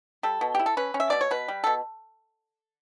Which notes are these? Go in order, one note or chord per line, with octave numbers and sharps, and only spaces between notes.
G3 A4
B2
E4 G4
A4
C#4 B4
C#4
E5
B2 D5
C#5
B2 B4
G3
B2 A4